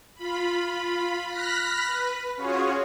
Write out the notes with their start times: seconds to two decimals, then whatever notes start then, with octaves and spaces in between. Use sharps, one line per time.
0.15 F4 B5
1.28 B5 F6 F#6 A#6 B6
1.87 B4
2.36 C#4 F4 F#4 G#4 C#5